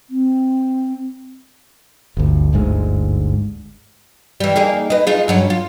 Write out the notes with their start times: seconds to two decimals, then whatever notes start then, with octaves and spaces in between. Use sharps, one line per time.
0.10 C4
2.17 G1 D2
2.53 G1 D2 G#2 G#3
4.40 E3 G3
4.56 A#3 D#4 G#4
4.90 B4 D#5
5.07 D#4 F4 G#4
5.28 G2 F#3 C#4
5.50 F4